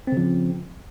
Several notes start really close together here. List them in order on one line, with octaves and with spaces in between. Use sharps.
C4 C#3 F3